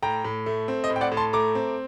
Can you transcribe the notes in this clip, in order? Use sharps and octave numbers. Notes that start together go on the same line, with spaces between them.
A2 G5 A#5
A2
A3
C4
D#5
A2
G5
D5 F#5
A2
A5 C6
A3 A#5 D6
C4